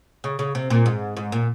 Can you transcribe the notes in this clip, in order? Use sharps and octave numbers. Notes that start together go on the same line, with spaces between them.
C#3
C#3
C3
A#2
G#2
G#2
A#2